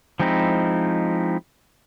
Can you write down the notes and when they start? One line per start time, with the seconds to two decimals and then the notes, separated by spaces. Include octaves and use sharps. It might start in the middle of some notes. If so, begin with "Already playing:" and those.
0.20 F3 G#3 C4 D#4 E4